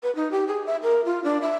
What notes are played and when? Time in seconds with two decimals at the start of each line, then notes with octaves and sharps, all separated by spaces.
0.03 B4
0.15 D#4
0.32 G4
0.47 G#4
0.66 E5
0.83 A#4
1.05 F4
1.24 D4
1.42 E5